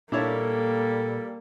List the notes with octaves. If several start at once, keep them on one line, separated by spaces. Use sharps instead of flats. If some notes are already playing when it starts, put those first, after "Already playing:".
A#2 G3 A#3 D4 E4 A4 C#5